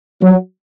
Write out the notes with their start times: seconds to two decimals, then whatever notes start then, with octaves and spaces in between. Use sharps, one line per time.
0.23 F#3